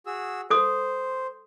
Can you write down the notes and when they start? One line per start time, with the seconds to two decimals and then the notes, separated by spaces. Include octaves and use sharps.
0.06 F#4 G#4 E6
0.50 A4 C5 D#6